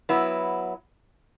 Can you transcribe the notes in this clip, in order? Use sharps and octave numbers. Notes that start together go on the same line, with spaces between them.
F#3 B3 E4